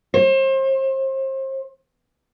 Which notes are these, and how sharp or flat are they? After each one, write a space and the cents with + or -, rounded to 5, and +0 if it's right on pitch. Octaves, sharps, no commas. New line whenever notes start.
C5 +35